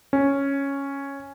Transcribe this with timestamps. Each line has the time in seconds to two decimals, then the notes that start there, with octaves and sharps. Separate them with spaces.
0.13 C#4